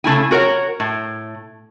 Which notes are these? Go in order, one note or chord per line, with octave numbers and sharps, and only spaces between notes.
C#3 A3 E4 G#5
F#4 A#4 C#5 F#5
A2